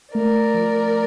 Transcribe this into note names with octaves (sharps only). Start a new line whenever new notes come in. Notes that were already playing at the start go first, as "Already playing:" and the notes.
A3 A#4 D5
F3